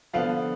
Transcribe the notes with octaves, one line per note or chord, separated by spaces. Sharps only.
D3 F3 B3 D4 F5